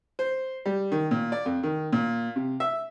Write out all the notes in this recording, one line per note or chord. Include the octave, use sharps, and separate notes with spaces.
C5
G3
D#3
A#2
D5
F2
D#3
A#2
C3
E5